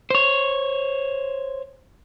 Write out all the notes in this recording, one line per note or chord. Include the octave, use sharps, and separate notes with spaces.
C5 C#5